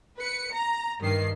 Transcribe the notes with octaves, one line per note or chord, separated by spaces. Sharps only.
B4 C#7
A#5
G2 D#3 C7